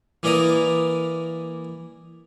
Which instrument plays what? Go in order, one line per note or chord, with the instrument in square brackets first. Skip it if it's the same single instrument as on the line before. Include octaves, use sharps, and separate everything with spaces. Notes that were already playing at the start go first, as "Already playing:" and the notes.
[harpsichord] E3 A#3 E4 D5 A#5 D#6